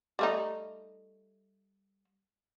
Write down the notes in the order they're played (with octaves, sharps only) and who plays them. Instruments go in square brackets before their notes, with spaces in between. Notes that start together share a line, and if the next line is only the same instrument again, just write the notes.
[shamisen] G3 A3 D#4